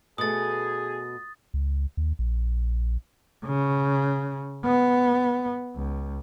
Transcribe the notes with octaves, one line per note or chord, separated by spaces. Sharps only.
B2 A3 G#4 D#6 A6
C#2
D#2
A#1
C#3
B3
C#2